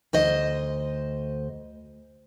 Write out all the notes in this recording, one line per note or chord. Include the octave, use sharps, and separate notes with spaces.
D2 C5 D#5